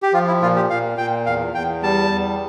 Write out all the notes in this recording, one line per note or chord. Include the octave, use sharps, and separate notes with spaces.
G4
F3 F4
E4
A#2 F4
G4
A#2 F5
A#2 G5
E2 F5
E2 G5
G3 A5
E2